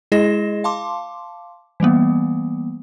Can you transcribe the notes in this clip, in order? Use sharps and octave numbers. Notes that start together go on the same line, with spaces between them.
G#3 E4 G#4 D#5 A#6 E7
F5 A5 C6 D6
E3 G3 A#3 B3